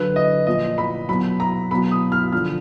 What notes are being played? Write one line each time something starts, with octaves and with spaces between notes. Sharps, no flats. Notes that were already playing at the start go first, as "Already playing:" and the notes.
Already playing: D3 F#3 B4
D#5
A#2 F3 D#5
B5
B2 F#3 B5
A#5
B2 F#3 B5
D#6
F6
D3 F3 F6